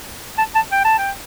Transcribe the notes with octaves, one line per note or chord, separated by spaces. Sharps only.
A5
A5
G5
A5
G5